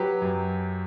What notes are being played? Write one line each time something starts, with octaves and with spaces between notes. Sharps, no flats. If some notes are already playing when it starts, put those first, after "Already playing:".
Already playing: F#3 G4 B4
F#2